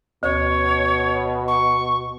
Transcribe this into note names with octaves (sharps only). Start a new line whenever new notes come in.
D2 B2 C#5
C#6